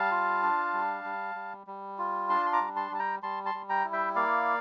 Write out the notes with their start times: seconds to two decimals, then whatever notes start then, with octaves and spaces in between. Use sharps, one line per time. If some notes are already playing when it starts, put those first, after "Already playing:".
Already playing: G3 F5 A5
0.11 F4
0.43 D4
0.73 G3
1.04 G3
1.35 G3
1.67 G3
1.98 F4
2.29 D4 A5 C6
2.46 C6
2.53 A#5 D6
2.61 G3
2.76 A5 C6
2.91 G3 A5
2.99 G5 A#5
3.23 G3 A5 C6
3.45 A5 C6
3.54 G3
3.69 G5 A#5
3.84 E4
3.93 E5 G5
4.16 A#3 D5 F5